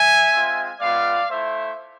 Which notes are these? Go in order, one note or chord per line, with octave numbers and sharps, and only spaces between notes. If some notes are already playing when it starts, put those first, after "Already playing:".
Already playing: E5 G#5
G#3 C4 F4
G#3 B3 F4 D5 F5
A3 E4 C5 E5